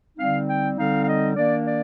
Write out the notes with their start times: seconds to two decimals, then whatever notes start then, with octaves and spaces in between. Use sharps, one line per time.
0.17 D3 G3 C4 D#4 F5
0.47 G5
0.76 D3 G3 C4 D#4 F5
1.02 F5
1.07 D#5
1.36 D#3 A#3 D4 D5
1.67 D5